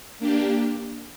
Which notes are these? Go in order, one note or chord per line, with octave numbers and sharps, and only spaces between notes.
A#3 D4 G4